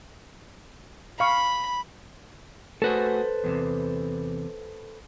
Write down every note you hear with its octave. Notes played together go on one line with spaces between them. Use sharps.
F5 B5 C#6
A3 F#4 G#4 A4 B4 C5
E2 A2 C3